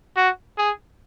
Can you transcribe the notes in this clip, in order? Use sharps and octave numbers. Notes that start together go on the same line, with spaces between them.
F#4
G#4